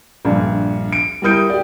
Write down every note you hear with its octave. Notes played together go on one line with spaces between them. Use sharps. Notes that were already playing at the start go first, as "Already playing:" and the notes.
A#1 G2
D7
G3 E4 A#4 D#6 G6 D7
G4 D5